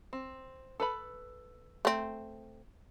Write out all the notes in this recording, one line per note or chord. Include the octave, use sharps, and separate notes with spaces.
C4
A4 B4 B5
A3 C4